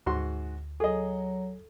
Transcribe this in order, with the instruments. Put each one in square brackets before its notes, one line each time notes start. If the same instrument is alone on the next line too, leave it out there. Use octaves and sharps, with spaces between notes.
[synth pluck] D2 [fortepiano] G#2 F#4 C6
[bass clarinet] F#3 [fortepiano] G#4 D#5 [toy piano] A4